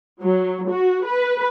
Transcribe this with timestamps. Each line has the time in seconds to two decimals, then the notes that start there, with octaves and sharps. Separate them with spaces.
0.23 F#3
0.70 F#4
1.06 B4